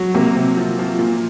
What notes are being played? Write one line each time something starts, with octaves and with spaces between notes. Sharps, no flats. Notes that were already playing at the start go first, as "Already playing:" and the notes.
Already playing: F#3
C3 A#3
C3
F3
F3
A#2